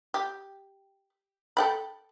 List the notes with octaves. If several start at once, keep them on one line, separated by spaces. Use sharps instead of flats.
G4
A4 G5 B5